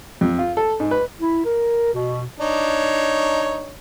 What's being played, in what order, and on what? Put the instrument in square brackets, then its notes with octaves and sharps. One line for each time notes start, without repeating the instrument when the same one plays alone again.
[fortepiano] F2
F4
A4
G#2
B4
[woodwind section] E4
A#4
B2
[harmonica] D4 D#4 C#5